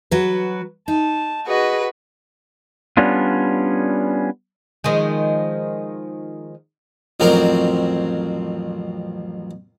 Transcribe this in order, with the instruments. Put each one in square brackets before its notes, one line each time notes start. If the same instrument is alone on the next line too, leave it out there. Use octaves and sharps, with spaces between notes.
[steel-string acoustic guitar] F#3 F#4 B4
[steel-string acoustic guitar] D#4 [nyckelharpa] A5
[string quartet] F#4 B4 [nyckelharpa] G#4 D#5
[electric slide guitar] G3 B3 C#4 D4 F4
[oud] D#3 F3 G#3
[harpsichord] A1 F2 F#3 C4 A#4